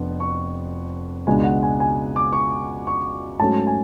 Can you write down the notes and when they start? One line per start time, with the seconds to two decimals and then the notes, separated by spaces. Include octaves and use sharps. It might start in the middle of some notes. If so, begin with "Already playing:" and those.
Already playing: F1 F2 B3 D4
0.20 C#6
1.27 C#2 B2 G#3 D4 G#5
1.44 F#5
1.63 G#5
1.80 G#5
2.16 D6
2.33 C#6
2.87 C#6
3.40 G#2 F#3 A3 C#4 A5
3.67 G#5